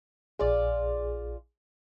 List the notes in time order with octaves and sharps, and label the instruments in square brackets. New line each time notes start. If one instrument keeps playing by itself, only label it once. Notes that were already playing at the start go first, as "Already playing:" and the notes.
[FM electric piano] A#1 G#4 [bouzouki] F4 D5